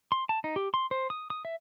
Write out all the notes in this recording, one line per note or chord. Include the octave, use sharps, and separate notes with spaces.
C6
A5
D#4
G4
C6
C5
D#6
D#6
E5